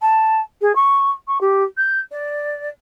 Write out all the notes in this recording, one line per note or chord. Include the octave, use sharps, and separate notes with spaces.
A5
G#4
C#6
C#6
G4
G6
D5